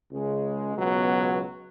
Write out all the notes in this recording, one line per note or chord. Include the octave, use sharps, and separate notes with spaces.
C#2 C#3 G#3
C#2 B2 F#3 B3